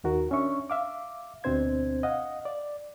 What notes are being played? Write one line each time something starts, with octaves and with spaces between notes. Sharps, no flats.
D#2 D#3 F#4 A#4
C#4 D4 E5 C#6
E5 F5 D6
D2 B2 C4 D4 C5 G#6
D#5 F5 F#5
D5